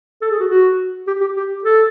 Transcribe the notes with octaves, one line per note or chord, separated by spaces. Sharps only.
A4
G#4
F#4
F#4
G4
G4
G4
A4